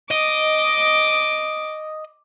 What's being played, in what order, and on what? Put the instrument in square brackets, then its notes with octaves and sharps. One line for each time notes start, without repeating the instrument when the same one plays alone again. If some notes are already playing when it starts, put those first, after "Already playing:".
[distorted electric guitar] D#5 [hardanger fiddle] D6